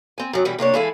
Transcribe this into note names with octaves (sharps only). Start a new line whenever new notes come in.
C4 G#5
F#2 F#3
B2 E3 G3 B3 C#4
C3 A#3 D4 C#5
E3 G#3 E4 A4 F5 G#5